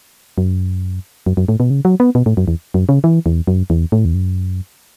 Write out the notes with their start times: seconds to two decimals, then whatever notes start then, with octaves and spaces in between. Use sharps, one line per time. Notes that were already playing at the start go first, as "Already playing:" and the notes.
0.38 F#2
1.26 F#2
1.37 F#2
1.48 A2
1.60 B2
1.70 C#3
1.85 F#3
2.00 B3
2.15 B2
2.26 A2
2.37 F#2
2.48 E2
2.74 F#2
2.89 C#3
3.04 E3
3.26 E2
3.47 F#2
3.70 E2
3.92 A2
4.05 E2
4.14 F#2